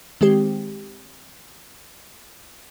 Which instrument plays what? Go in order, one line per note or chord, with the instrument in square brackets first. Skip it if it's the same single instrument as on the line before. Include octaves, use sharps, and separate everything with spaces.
[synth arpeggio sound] D#3 G#3 C4 G4